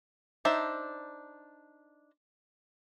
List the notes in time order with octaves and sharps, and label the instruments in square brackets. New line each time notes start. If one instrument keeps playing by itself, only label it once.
[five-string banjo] D4 D#4 C5 E5 A5